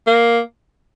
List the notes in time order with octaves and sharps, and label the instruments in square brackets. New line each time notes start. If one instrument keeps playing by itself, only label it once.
[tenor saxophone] A#3